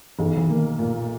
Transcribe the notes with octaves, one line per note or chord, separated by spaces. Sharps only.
B1 E3
E3
D#3 A#3
A#2